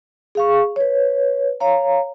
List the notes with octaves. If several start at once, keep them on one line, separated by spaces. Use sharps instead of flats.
G#4 F5 C#6
B4 C#5
C#5 F5 A#5